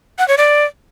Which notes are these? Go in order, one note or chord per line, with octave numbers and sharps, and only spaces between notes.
F#5
C#5
D5